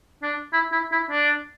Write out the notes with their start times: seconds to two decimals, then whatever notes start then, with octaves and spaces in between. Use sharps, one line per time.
0.23 D4
0.53 E4
0.72 E4
0.92 E4
1.11 D4